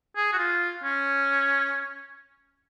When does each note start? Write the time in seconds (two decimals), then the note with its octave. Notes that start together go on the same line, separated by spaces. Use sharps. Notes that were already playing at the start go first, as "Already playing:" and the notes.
0.17 G#4
0.33 F#4
0.38 F4
0.84 C#4